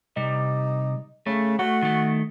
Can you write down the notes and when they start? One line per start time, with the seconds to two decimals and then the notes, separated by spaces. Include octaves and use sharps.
0.17 C3 G3 D#4
1.26 C#3 A3
1.59 A3 F#4
1.82 D#3 A3